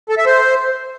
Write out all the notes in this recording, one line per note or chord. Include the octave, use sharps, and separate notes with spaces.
A4
E5
C5